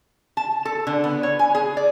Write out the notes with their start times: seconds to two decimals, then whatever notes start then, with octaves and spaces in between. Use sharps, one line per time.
0.37 A5
0.65 A4
0.87 D3
1.04 B3
1.23 C#5
1.39 G#5
1.55 G#4
1.77 D5